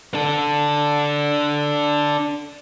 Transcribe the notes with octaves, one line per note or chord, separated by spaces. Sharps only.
D4 A4